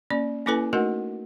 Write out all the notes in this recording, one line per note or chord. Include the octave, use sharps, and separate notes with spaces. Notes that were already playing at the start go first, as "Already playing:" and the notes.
A#3 C#4 D5
A#3 C#4 E4 A4 B4 G#5
A3 D#4 F#4 A#4 D#5 F#5